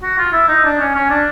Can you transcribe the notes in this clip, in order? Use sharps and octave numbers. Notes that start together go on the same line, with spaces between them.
F#4
F4
E4
D#4
D4
C#4
C#4
D4